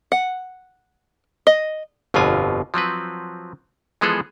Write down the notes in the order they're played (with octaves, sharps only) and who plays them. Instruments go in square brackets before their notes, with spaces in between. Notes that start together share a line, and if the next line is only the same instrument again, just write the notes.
[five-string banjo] F#5
D#5
[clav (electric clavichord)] G1 F2 B2 D3 F4 G#5
F3 F#3 C4 B4
E3 F3 G#3 B3 G#4 A4